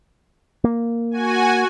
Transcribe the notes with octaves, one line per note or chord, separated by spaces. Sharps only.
A#3
F#4 G#5